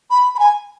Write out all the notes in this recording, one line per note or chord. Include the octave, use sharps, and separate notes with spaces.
B5
B5
G#5